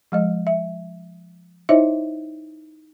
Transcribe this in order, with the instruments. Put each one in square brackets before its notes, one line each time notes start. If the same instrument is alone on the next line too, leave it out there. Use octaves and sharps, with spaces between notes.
[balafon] F3 G#3 D#5
E5
D#4 E4 C5 C#5 D#5 E5